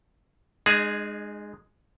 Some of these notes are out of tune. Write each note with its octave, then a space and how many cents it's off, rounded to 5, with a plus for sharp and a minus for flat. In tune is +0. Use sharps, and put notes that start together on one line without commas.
G#3 +0 D#4 -40 G#4 +0